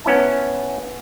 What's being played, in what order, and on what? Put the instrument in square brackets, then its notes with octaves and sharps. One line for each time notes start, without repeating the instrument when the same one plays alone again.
[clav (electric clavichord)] B3 C#4 E4 A5